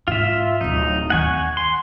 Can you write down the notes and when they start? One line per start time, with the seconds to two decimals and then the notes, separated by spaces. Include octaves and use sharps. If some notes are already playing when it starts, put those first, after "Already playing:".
0.08 G#2 F4 E5
0.61 D1 G#1 D#4
1.10 D#2 D#3 F#5 G#5 C#6
1.57 C6